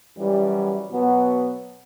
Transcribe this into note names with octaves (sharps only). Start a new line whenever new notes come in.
F#2 E3 G3
B2 F#3 B3